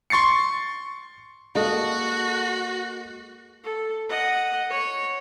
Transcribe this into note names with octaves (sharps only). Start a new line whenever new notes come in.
C6 C#6 A6 C7 C#7
G#3 A#3 F#4 A4 D#5 F5
A4
D#5 F#5
C#5